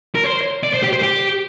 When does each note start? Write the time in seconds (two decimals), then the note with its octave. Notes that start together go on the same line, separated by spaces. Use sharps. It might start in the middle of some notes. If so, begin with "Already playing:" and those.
0.15 A#4
0.24 C5
0.63 D5
0.73 C5
0.83 G4
0.93 C5
1.02 G4